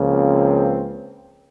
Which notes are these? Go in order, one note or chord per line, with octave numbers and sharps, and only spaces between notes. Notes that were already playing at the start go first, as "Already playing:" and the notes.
Already playing: C#2 C#3 F3 A#3
C4